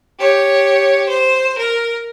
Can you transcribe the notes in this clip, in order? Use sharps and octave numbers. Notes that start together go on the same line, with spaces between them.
G4 C#5
C5
A#4